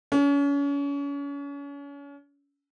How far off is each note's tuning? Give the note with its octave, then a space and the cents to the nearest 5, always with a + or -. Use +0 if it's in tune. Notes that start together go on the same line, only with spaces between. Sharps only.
C#4 +35